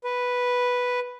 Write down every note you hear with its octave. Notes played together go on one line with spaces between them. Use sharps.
B4